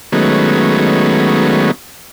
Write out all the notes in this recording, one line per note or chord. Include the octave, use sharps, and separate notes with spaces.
D#3 F#3 G#3 A3 B3 C#4